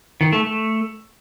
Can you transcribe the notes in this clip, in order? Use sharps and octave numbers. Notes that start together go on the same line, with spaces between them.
D#3
A3
A3